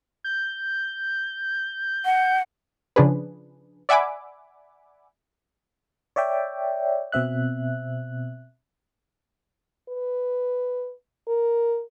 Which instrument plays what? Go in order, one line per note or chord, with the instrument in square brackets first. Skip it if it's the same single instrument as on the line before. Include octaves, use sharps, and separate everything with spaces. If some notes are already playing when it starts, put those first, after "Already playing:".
[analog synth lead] G6
[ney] F#5
[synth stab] C#3 F3 D4 G#4 B4
D5 E5 F#5 G#5 B5 D6
[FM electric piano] C#5 D5 E5 G5
B2 C4 E5 F#6
[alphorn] B4
A#4